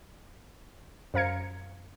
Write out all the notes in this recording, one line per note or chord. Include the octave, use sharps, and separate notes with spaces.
F#2 C5 F5 A#5 G#6 C#7